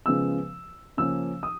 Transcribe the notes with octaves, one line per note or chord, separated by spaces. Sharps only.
C#3 F3 G#3 B3 E6
C#3 F3 A#3 C#4 E6
D#6